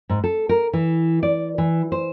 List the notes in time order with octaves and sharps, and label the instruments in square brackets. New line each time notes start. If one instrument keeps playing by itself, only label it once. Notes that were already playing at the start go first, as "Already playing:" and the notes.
[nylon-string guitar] G#2
A4
A#4
E3
D5
E3
C5